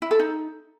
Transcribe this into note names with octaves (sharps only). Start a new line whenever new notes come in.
E4
A4
D#4